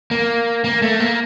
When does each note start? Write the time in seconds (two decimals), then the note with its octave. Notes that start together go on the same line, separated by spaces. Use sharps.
0.11 A#3
0.64 A#3
0.82 A3
1.00 A#3